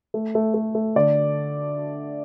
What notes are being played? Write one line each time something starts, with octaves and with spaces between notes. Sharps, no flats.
A3
A3
A3
A3
D3 D5